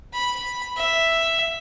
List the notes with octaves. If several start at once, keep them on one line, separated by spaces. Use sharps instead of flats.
B5
E5